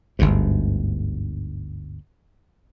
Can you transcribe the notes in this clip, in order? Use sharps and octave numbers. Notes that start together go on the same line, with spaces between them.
G1 D2 G#2